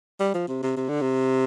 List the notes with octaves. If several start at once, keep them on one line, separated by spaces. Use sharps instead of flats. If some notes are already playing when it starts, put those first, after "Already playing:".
G3
F3
C3
C3
C3
D3
C3